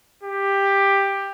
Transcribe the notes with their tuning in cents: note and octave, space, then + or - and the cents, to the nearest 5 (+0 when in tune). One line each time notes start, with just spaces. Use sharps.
G4 +10